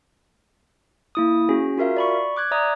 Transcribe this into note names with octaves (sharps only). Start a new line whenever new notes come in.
A#3 E4 D#6
C#4 F#4 G#4
F4 F#4 A#4 E5 F5
D5 B5 C#6
D6 F#6 G#6
D5 E5 A#5 D#6